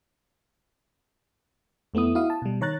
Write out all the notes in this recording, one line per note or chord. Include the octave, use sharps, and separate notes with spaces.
F2 A3 B3 E4 D#6
E4 F#4 F5 D#6
A5
B2 G3
D#3 C#5 A#5 F#6 A6